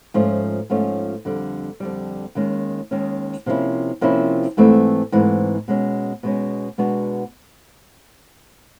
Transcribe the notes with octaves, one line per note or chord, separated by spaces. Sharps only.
G#2 F3 A3 C#4 F4
G#2 F3 A3 C#4 F4
F2 D3 G3
F2 D3 G3
D#2 D#3 G#3 C#4
D#2 D#3 G#3 C#4
C3 F3 A#3 C#4 E4
C3 F3 A#3 C#4 E4
G#2 E3 A3 C4
G#2 E3 A3 C4
B2 G#3 C#4
B2 G#3 C#4
B2 G#3 B3 D4 F#4